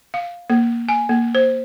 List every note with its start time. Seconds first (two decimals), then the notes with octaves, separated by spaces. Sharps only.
0.14 F5
0.50 A#3
0.89 G#5
1.09 A#3
1.35 C5